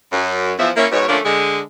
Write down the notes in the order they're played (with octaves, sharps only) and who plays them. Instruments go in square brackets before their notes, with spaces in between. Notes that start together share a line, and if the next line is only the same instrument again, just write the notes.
[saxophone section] F#2
E2 F3 E5
A#3 C#4 E4
G#2 B2 C#5
D3 F3 A3 A#3 C#4 D4
D3 G#3